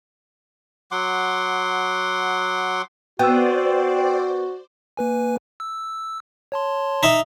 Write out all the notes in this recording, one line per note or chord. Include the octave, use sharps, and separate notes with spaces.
F#3 F#5 C6 D6
B3 F#4 C5 D5 G5 E6
A#3 B4 G#5
E6
C#5 A5 C6
D#4 E5